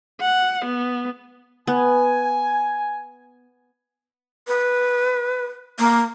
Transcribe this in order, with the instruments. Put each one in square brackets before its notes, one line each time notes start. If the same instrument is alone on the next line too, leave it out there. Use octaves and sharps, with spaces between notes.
[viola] F#5
B3
[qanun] B3 [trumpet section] G#5
[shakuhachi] B4
A#3